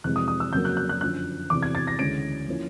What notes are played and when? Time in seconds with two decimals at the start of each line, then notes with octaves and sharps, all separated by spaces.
0.04 F2 C3 E3 G#3 F#6
0.16 D#6
0.28 D#6
0.40 E6
0.53 F2 C#3 F#3 A#3 G6
0.65 F#6
0.77 F#6
0.89 F#6
1.01 F#2 D3 F3 F#6
1.50 E2 C3 E3 D6
1.63 G#6
1.75 A6
1.87 A#6
1.99 D2 C#3 E3 G#3 C#4 D7
2.48 F3 A#3 C#4 E4